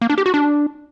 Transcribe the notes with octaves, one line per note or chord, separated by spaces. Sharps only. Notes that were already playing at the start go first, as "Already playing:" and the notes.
A#3
D4
G4
F#4
D4